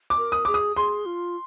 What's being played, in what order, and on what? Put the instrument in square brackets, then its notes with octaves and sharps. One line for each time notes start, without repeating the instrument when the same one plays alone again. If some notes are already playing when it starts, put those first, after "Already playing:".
[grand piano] D6
[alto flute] A#4
[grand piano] D#6
[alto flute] G#4 [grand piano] D6
[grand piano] D#6
[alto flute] G#4 [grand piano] C6
[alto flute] F4